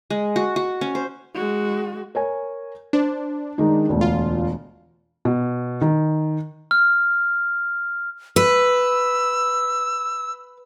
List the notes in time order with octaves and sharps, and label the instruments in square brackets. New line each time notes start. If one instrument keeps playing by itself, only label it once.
[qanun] G#3
F#4
F#4
C#4
C5
[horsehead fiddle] G#3 F#4
[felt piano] A#4 C#5 G#5
[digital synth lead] D4 [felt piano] C5
[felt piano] D#3 G#3 D#4
E1 D2
[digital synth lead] F4
[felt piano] B2
D#3
[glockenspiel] F6
[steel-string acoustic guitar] B4 [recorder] E6